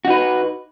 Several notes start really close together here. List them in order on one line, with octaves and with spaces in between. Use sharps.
F#4 D#4 B4